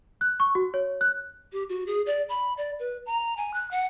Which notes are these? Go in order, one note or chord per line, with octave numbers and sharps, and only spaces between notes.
F#6
C#6
F#4
C#5
F#6
G4
F#4
G#4
D5
B5
D5
B4
A#5
G#5
F#6
F#5